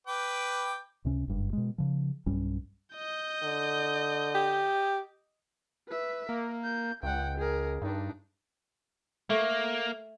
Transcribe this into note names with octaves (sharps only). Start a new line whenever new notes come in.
B4 G5 D6
C#2 C3 C#4
F#1 G2
B2 G#3
C#3 F3
B1 G2 G3 C#4
D#5 G6
D3
G4
B4 E5
A#3 A#4
G6
C#2 F#5 G5
G#4 A#4
G2 D4 D#4
A3 A#3